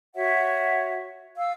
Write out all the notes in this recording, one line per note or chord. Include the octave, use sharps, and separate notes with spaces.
F#4 C#5 E5 F#5
F5 E6